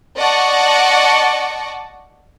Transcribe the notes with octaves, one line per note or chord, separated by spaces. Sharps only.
D5 D#5 F#5 A5 C#6